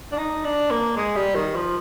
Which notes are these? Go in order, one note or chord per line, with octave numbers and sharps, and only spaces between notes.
D4
D#4
D4
A#3
G#3
G3
D#3
F3